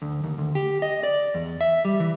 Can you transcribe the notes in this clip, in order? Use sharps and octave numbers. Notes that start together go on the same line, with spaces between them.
D2
D#2
D2
G4
D#5
D5
E2
E5
G3
E3